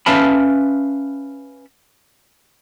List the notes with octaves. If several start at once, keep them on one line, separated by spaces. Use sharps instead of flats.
C#4 B4 E5 F5 A5 B5